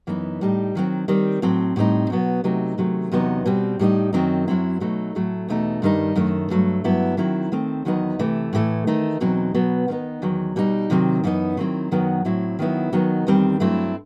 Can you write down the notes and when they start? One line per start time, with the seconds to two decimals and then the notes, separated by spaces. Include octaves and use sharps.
0.07 F#2 E3 B3 D#4
0.41 A2 G3 D#4
0.75 D#3 F#3 C4
1.08 D#3 G3 C4
1.42 A2 F#3 C4
1.76 A2 G3 C4 D#4
2.10 B2 F#3 B3
2.44 C3 F#3 A3 D#4
2.78 C3 D#3 F#3 A3
3.11 E2 C3 F#3 B3 D#4
3.46 B2 G3 C4
3.79 A2 G3 B3 D#4
4.13 F#2 D#3 F#3 C4 D#4
4.48 F#2 F#3 C4 E4
4.80 B2 F#3 A3 D#4
5.15 A2 F#3 A3
5.48 E2 B2 A3 D#4
5.82 G2 D#3 G3 D#4
6.16 F#2 D#3 A3
6.50 G2 F#3 A3
6.84 G2 F#3 B3 E4
7.17 D#3 F#3 C4 E4
7.52 D#3 A3 C4
7.85 E2 D#3 F#3 B3 D#4
8.19 C3 E3 A3
8.53 A2 E3 A3
8.87 D#3 A3 D#4
9.20 E2 B2 F#3 C4 D#4
9.54 B2 F#3 B3
9.88 D#3 G3 B3 D#4
10.22 E2 D#3 F#3
10.56 B2 G3 D#4
10.90 C3 D#3 F#3 C4
11.24 F#2 E3 B3 D#4
11.57 D#3 F#3 C4 E4
11.91 F#2 D#3 F#3 B3
12.25 A2 F#3 C4 E4
12.59 D#3 F#3 B3 E4
12.93 D#3 F#3 B3 D#4
13.27 E2 D#3 G3 C4
13.60 G2 F#3 A3 C4 E4